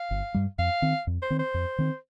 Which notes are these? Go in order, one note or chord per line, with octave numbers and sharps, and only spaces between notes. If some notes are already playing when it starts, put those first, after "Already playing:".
Already playing: F5
G1
G2 G3
F2 F5
D#3 C4
F2
C5
D#3 C4
C5
F2
D#3 C4